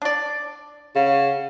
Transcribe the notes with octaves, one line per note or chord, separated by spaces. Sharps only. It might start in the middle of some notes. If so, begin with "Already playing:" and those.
D4 D5
C#3 F5 F#5